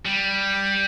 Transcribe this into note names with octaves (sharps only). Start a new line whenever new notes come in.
G3